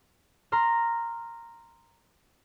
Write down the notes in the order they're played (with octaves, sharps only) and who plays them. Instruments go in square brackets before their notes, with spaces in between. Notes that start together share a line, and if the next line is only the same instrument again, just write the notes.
[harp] A#5 C6 F6